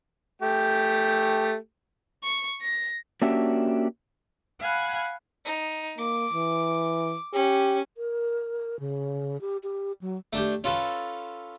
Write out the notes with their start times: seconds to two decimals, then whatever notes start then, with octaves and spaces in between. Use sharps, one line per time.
0.42 A3 G4
2.24 C#6
2.61 A#6
3.22 A#3 C#4 D4 F#4 G4 E5
4.60 F5 F#5 G#5 B5
5.45 D#4
5.98 A#3 D6
6.33 E3
7.33 C#4 G4
7.97 A#4
8.80 C#3
9.41 G4
9.63 G4
10.01 F#3
10.33 A3 D4 G4
10.64 C#4 F4 A4 B4 A5